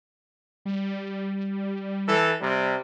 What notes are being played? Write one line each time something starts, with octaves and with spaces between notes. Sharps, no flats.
G3
E3 A4
C3 G3